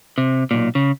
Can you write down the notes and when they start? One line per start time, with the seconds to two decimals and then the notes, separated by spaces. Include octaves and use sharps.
0.18 C3
0.51 B1 A#2
0.75 C#3